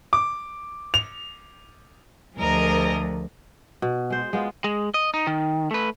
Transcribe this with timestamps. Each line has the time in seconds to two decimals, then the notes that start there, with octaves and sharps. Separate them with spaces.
0.13 D6
0.94 F7
2.36 D2 F3 G#4 A#4 D#5
3.82 B2
4.10 G#3 C5
4.33 G#3 B3 F4
4.64 G#3
4.94 D#5
5.14 D#4
5.27 D#3
5.71 A3 B4